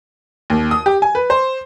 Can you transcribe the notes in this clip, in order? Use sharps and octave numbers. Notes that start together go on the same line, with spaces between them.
D#2
D#6
G4
G#5
B4
C5